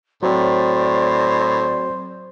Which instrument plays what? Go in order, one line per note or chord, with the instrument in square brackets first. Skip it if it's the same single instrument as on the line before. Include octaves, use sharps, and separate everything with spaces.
[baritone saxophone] A2 [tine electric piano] F#3 C4 [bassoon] C5 [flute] D5